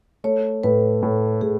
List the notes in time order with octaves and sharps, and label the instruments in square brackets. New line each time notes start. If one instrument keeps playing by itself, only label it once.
[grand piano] A3 [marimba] C#5
[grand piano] A2 [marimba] B4
[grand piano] A2
[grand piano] A2 [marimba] G#4